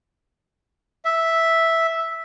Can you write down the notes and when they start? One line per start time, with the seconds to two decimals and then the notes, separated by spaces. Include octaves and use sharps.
1.05 E5